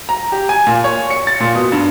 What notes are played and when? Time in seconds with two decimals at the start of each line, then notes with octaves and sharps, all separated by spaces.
0.09 A#5
0.32 G4
0.49 G#5
0.67 A#2
0.84 C#5
1.10 C#7
1.27 A6
1.40 A#2
1.55 B2
1.72 G2